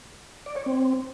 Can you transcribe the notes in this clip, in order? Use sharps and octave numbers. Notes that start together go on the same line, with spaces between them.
D5
C#5
C4